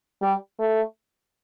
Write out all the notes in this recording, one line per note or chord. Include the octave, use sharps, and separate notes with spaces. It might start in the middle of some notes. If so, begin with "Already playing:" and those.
G3
A3